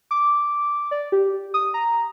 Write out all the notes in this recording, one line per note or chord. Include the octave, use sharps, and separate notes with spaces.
D6
D5
G4
D#6
A#5